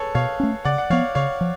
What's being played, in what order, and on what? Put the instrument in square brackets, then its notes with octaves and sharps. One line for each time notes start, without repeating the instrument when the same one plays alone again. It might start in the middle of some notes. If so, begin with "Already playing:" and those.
Already playing: [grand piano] G#4 A4 B4 C#5
[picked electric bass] B2 [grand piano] C#5 F5
[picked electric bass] A3 C#4
[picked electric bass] C#3 [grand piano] D5 F#5
[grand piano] F#5
[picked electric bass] F3 B3 [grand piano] C#5 F5
[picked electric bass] C#3 [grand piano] C#5 F5
[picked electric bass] F3